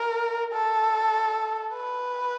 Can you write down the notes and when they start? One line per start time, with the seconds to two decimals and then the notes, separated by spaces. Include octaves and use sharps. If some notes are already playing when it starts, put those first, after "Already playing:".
Already playing: A#4
0.53 A4
1.74 B4